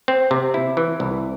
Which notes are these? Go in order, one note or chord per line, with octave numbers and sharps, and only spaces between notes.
C4
C3
E4
E3
C2